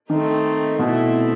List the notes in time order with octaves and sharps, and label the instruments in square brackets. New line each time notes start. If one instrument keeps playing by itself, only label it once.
[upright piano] D#3 [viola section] A3 C4 D#4
[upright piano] B2 [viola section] A3 C4 E4